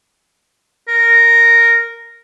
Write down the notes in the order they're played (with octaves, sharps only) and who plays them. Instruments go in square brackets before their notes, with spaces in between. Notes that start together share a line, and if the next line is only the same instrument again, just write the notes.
[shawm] A#4